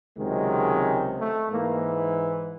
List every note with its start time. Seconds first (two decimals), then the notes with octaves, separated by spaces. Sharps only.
0.17 C#2 C3 D#3 F#3 G#3
1.16 A3
1.49 G#2 E3 A#3